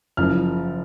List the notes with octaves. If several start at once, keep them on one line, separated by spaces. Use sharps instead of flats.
F#1 F#2 C#3 F3 F6